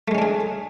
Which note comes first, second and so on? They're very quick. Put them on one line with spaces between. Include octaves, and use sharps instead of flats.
A3 G#3 C#4 D4 G#4